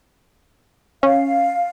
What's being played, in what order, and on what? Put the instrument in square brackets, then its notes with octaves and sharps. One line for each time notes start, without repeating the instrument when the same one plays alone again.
[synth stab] C#4 [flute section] F5